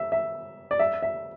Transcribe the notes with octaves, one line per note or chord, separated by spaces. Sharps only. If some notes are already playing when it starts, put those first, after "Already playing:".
Already playing: E5
E5
D5
E5
E5